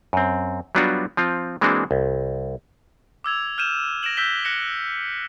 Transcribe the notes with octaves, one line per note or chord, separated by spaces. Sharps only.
F#2 C4
F#3 G3 B3 D4 F4 F#4
F3 C4 F4
E3 G#3 A#3 C4 D4 F#4
C2
D6 E6 G#6 F7
F6 G6 D#7 E7
A#6 D7 E7 F#7
E6 F#6 G6 B6 G7
F#6 A#6 C#7 E7